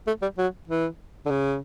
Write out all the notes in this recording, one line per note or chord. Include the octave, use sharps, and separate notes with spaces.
A3
G3
F#3
E3
D3
C#3